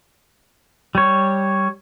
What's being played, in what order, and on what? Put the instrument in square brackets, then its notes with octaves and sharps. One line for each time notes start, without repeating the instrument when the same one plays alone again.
[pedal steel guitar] G3 C#5